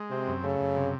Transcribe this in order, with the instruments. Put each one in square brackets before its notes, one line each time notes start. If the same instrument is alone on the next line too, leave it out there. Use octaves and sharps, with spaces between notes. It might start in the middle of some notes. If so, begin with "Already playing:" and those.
Already playing: [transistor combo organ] G#3
[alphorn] C3 [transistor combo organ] C4
[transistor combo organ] F#2
[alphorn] C#3 [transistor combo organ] A3
[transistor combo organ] F#2
C3